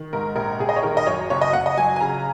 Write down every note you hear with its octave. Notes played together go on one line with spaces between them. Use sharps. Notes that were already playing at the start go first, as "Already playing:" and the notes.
Already playing: D#3
G#2 A#4
A#1 A#4
A#1 G#4
D#5
C#5
D#3 A#4
D#5
F#2 C#5
F#1 C#5
D#5
F#1 F#5
D#5
F#3 G#5
G#5
C#3 A#5